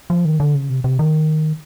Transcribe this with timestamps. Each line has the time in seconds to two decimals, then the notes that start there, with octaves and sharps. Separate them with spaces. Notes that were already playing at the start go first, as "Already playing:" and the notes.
0.10 F3
0.25 D#3
0.40 D3
0.55 C#3
0.70 C3
0.84 C3
0.99 D#3